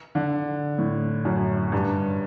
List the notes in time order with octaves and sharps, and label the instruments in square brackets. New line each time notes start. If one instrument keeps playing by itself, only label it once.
[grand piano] D3
A2
F#2
G2